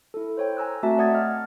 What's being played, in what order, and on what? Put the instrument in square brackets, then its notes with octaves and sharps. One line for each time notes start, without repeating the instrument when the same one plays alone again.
[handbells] E4 A4
C5 C#5 G5
G#5 A#5 E6 F#6
A3 C4 F#4 E5 A5 A#5
D5 F#5 D#6 G#6 A6
D#5 F6